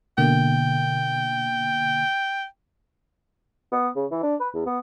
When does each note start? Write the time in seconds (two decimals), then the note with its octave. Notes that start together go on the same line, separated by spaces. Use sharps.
0.18 B2 D3 A#3 G5
3.72 B3
3.96 C#3
4.11 E3
4.23 D4
4.40 B4
4.54 E2
4.66 B3